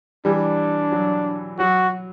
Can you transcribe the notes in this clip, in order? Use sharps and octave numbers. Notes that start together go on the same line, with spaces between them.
E3 G3 D4
F#3
F#3 F#4